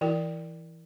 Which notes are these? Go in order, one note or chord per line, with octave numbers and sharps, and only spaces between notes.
E3 E4 A#4 G5